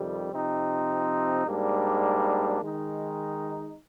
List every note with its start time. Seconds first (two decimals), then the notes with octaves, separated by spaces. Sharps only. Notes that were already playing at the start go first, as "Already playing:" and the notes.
Already playing: F2 C3 D#3 G3
0.30 C3 F3 C4 D#4
1.46 G#2 G3 A#3 D4
2.61 D#3 G#3 D#4